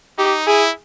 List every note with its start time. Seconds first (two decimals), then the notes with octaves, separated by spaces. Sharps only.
0.18 D#4 G4
0.47 E4 G#4